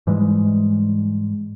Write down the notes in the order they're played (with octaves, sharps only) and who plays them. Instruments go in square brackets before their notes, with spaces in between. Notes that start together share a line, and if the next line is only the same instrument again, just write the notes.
[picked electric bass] G#2 E3 G3 G#3